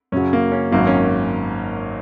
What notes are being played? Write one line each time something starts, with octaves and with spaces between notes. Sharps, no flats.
F#2 C#3 F#3 C#4
A#3
C#4
G#1 F#2 D#3 F#3 A#3
C#4